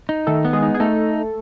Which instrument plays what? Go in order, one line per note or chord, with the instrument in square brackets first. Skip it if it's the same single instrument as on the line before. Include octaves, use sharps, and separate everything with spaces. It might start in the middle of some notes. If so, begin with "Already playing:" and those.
[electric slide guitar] D#4
[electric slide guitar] D#3 [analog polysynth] A3 A4
[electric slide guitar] B3
[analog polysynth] G#3 G#4
[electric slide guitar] D#4
[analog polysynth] G#4
[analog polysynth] A3 A4 [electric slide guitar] D#4